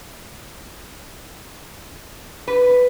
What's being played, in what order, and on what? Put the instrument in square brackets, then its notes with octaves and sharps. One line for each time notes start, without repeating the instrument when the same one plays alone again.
[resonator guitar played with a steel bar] B4